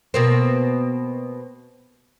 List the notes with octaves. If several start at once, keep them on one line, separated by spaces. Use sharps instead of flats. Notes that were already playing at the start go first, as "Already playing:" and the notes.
B2 A#3 C4